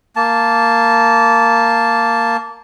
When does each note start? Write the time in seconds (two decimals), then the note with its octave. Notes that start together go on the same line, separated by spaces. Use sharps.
0.16 A#3 A5